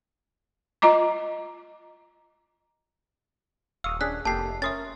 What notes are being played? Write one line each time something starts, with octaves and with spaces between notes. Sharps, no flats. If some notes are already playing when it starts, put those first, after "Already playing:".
F4 D#5 A#5 D6
D#1 F5 C#6 D#6 E6
C#4 D4 G#4 F#6 B6
F1 A#3 G4 A4 A5 C7
C#4 A#4 E5 C6 D#6 A6